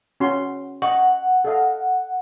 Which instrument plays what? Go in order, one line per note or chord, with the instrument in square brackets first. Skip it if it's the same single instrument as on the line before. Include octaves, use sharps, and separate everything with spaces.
[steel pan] C#4 F#4 C6
[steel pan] D#5 G5 C#6 [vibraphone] F#5
[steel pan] A4 D#5 F5